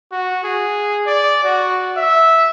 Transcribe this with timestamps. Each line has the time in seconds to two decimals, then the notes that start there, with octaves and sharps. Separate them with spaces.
0.12 F#4
0.44 G#4
1.07 D5
1.44 F#4
1.97 E5